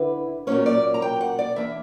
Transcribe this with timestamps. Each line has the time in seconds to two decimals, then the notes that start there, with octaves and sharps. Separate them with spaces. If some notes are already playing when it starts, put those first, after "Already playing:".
Already playing: D3 E4 B4
0.47 A#2 F#3 A#3 C#4 C#5
0.66 D5
0.94 A#5
1.02 G5
1.21 F#5
1.39 D5
1.56 E3 A#3 D4 E5